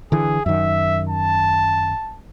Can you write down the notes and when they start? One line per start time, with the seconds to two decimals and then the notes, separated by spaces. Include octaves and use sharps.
0.12 D3 E3 G#4
0.46 F#2 D#3 E5
1.09 A5